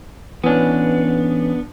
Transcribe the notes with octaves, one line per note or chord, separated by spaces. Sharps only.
E3 B3 C#4 D4